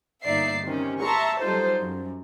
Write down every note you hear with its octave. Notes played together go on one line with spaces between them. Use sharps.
G1 A#3 D#4 D5 E5 C7
C3 D#3 C#4
E5 A5 A#5 C6 C#6
F#3 G3 D#4 F4 A4 C5
F#2